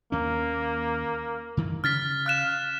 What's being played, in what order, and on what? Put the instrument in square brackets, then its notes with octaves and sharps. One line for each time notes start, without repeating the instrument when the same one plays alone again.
[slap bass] D#2 C#4 [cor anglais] A#3
[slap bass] F#2 D#3 E3
[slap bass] C#3 [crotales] F6 A6 B6
[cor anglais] F5 [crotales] F6 F#6 E7